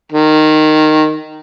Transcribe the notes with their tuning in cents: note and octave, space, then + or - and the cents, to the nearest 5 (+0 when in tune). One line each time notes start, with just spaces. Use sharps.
D#3 -10